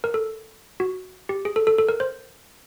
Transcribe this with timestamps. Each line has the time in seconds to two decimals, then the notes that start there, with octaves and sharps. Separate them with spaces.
0.04 A#4
0.14 A4
0.80 F#4
1.29 G4
1.45 G#4
1.56 A4
1.67 A4
1.78 A4
1.89 A#4
2.00 C5